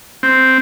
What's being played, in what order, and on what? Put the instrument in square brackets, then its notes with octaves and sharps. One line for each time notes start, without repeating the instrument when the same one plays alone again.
[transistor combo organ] C4